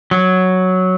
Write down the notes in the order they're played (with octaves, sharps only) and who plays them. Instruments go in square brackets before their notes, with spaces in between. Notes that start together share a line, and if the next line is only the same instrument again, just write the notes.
[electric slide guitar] F#3